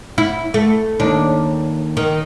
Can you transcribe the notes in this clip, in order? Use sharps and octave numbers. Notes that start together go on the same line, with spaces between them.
E4
A3
D#2 D4
D#3